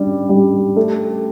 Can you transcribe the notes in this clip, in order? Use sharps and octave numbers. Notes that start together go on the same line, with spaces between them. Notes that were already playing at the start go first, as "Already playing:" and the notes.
Already playing: G3 D4
G3
A3